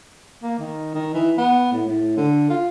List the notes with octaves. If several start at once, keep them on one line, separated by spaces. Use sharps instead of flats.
A#3
D#3
D#3
E3
B3
A2
A2
D3
F4